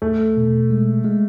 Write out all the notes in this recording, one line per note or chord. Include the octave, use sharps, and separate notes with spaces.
E2 A3
B2
G#3
G#3